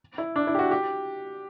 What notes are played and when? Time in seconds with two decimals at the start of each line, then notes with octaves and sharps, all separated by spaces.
0.18 E4
0.36 D4
0.47 E4
0.55 G4
0.59 F#4
0.71 G4